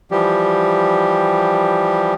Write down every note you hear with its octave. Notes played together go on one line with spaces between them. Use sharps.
E3 F3 G3 G4